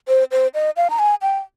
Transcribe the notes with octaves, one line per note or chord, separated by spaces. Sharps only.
C5
C5
D#5
F5
A#5
G#5
G5